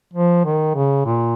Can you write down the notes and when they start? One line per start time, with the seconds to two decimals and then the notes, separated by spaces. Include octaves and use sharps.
0.14 F3
0.45 D#3
0.75 C#3
1.06 A#2